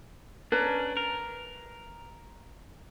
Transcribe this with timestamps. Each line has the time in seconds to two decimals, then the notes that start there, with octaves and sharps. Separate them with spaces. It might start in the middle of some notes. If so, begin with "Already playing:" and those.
0.52 C#4 D4 B4 A#5
0.97 A#4